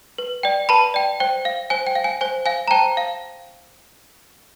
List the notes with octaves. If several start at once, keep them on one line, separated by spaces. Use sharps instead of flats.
B4
D5 G5
B4 A5 B5
D5 G5
C5 G5
F5
C5 G#5
G5
F5
G#5
C5 G#5
F5 G#5
A#5
C5 G5 A5
F5